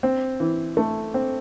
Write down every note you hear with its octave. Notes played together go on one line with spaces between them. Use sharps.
C4
E3
A3
C4